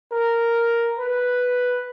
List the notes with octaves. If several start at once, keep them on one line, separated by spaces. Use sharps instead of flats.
A#4
B4